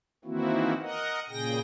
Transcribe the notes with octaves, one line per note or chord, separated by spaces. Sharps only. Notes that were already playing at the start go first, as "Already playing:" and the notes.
D#3 E3 A#3 C4 E4 F#4
A#4 D#5 F#5
A#2 C#3 G#4 G5 A#6